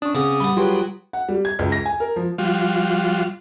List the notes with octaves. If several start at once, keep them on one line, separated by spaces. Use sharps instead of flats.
C#4 D4 C#6 D#6
C#3 B3 C4 G#4 D6 D#6
G3 B3 B5
F#3 F4 G4 G#4 B4 G5 C6
F#5
G3
G#6
C#2
A#6
G#5
A#4
F3
F3 G3 F4 F#4